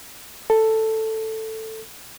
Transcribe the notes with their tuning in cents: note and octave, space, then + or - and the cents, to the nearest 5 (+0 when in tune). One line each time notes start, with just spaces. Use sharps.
A4 +5